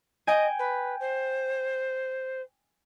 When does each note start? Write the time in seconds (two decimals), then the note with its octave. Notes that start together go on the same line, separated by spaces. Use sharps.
0.27 D#5 G5 G#5
0.58 B4
1.00 C5